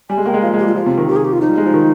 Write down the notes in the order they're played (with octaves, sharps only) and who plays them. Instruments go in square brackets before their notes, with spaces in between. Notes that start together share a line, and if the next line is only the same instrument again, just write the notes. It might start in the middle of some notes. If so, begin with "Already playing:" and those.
[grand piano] G3 [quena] G#5
[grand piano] G#3
[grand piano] A#3 [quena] G5
[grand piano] G#3
[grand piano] F3 [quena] F5
[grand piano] G#3
[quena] G4
[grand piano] G3 [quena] F4
[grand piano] F3 [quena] F4
[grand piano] C3
D#3
[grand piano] D#3 [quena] G4
[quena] G#4
G4
F4
[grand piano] F3 [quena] D#4
[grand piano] G3
G#3
F3
D#3